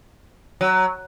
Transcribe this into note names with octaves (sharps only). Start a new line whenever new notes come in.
F#3